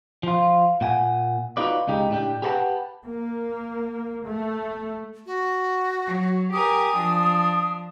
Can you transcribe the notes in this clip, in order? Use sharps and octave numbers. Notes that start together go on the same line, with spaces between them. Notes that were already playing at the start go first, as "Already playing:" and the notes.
F3 F4
A#2 F#5 G#5
D#4 F4 F#4 B4 D5
C#2 C#3 D#4 G4
A2 D4 G4
G4 G#4 B4 C#5 F#5 A5
A#3
A3
F#4
F#3
G4 A#4 G#5 D#6
F3 D4